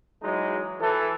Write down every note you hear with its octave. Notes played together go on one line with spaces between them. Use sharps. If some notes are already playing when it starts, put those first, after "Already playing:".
E3 F#3 G#3 D#4
E3 A4